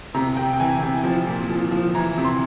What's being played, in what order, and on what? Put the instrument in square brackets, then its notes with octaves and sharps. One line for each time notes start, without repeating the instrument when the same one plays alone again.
[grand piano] C3 A#5
C3 G5
G5
E3 G#5
C3 G5
F3
A#2
F3
F3
E3 A#5
C3
C6